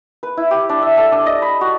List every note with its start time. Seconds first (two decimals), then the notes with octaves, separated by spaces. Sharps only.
0.23 B4
0.37 E4
0.51 G4
0.69 D4
0.82 E5
0.97 A4
1.12 D4
1.26 D#5
1.42 B5
1.61 F#4